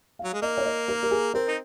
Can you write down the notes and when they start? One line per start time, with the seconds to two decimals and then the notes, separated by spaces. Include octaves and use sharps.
0.19 F#3 F5
0.33 G#3
0.42 A#3 D#5
0.57 C#5
0.65 D#5
0.88 A#4
1.03 A#4
1.11 G#4
1.34 C4 A#4
1.48 D#4